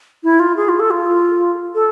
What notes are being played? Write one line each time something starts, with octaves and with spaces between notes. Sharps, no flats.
E4
F4
G#4
F4
A4
F4
A4